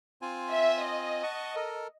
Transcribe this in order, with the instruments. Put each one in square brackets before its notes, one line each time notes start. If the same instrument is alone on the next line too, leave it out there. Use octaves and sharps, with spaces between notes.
[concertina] C4 F4 G#5
[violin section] E5
D#5
[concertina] F#5 A5 C#6
A4 A#4